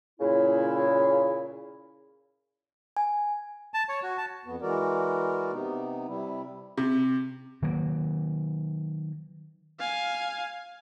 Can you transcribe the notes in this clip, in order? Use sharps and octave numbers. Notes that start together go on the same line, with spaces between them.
A#2 C#3 E4
G#5
A5
C#5
F#4
A5
F2 B3
E3 G#3 F#4 A#4 D5
C3 B3 D#4
C3 G3 E4
C3
D#3 F#3 A#3
F5 G#5